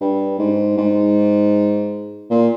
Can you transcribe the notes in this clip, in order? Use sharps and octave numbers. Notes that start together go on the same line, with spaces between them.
G2
G#2
G#2
A#2